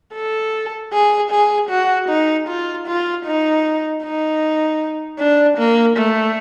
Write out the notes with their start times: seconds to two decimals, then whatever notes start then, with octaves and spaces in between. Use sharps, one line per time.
0.15 A4
0.93 G#4
1.31 G#4
1.70 F#4
2.09 D#4
2.48 F4
2.87 F4
3.26 D#4
4.03 D#4
5.19 D4
5.58 A#3
5.96 A3